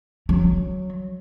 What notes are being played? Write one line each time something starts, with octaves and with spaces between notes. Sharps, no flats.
F#3